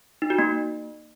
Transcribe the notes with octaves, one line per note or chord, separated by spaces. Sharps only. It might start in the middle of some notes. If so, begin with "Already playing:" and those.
D#4
F#4
A#3